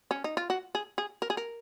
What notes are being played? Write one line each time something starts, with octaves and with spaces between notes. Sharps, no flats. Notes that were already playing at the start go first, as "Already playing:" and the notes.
C#4
D#4
F4
F#4
G#4
G#4
A#4
G#4
A#4